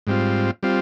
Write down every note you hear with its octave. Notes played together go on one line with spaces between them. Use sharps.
G#2 G3 C4 F4
G3 C4 F4